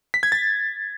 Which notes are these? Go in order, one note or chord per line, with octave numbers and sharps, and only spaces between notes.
B6
G#6
A6